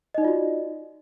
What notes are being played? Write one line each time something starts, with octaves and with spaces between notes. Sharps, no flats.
D#4 F4 F#4 D5 D#5